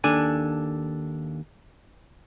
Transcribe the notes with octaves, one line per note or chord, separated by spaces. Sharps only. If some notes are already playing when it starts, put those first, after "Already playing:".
D#2 D4 A4 G#5